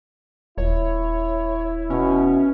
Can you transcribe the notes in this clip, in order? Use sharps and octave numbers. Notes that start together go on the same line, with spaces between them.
D#1 E4 C#5
B2 C#4